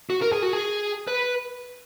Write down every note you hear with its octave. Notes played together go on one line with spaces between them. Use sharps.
F#4
A#4
G#4
F#4
G#4
B4